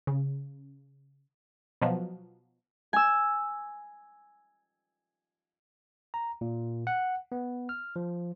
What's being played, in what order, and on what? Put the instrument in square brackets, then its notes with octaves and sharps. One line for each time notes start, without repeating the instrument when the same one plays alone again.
[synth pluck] C#3
[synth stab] B2 F3 F#3
[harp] G#5 E6
[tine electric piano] A#5
A#2
F#5
B3
F6
F3